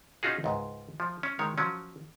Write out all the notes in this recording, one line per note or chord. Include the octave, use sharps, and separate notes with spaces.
C#4 D#4 F4 F#4 G#4
C#2 G#2
F3
C#4
D#3 G#3 C#5
F3 F#3 C#4